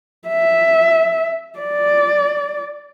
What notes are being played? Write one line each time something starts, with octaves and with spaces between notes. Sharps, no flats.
E5
D5